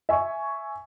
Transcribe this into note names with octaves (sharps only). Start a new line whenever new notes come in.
E5 G#5 C#6